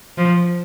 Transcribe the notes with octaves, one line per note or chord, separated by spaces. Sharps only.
F3